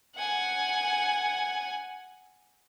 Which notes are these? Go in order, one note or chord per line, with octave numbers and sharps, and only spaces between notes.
F#5 G#5